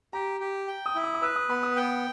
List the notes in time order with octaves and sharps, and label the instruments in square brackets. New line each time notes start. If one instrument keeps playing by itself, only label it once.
[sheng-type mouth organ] G4 [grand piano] A#5
[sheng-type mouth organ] G4
G5
[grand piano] D#6
[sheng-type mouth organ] E4
[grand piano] D#6
D#6
[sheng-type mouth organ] B4 [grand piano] E6
[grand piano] D#6
[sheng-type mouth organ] B3 [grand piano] B5
[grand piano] D#6
[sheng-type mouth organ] G5